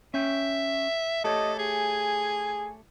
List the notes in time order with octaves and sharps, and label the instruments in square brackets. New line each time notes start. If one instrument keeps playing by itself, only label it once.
[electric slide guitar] C#4 G5 [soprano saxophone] E5
[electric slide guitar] A3 G4 C#5 [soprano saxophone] A4 [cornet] D#5
[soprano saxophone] G#4 [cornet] G#5